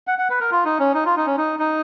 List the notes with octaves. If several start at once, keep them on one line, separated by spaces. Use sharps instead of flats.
F#5
F#5
B4
A#4
F4
D#4
C#4
D#4
F4
D#4
C#4
D#4
D#4